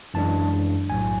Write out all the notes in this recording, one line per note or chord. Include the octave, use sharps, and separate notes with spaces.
F#2 E3 G#3 D4 A5
B1 A2 F#3 G#5